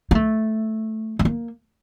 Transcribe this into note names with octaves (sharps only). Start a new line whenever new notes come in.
A#3
A3
A3
A#3